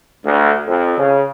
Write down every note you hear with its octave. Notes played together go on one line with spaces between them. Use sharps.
D2
F2
C#3